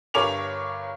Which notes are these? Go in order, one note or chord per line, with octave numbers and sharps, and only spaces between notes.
G1 G2 A#4 C#5 D6 F7